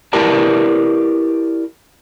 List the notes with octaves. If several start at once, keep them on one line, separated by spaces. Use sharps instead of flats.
E4 G4 A#4 B4 D5 A5